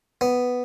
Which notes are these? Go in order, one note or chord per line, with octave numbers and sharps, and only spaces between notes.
B3